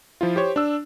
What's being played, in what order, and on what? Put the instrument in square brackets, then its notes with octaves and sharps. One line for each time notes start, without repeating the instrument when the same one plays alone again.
[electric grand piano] F3 E4 F4
G4 C5 C#5
D4 E6